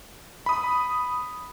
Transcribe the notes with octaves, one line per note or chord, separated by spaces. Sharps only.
B5 D#6